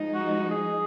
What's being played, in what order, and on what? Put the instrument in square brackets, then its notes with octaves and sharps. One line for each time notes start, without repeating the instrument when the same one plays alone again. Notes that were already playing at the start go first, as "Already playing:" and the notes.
Already playing: [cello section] F3 G#3 D#4
[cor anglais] F#4
G#4